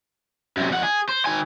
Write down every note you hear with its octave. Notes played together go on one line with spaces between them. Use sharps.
F#2 C3
F2 F#5
G#4
C5
D#3 G#5